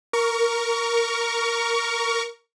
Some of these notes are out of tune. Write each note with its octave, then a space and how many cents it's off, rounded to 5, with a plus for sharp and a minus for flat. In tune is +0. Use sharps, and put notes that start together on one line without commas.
A#4 +0 C#6 +30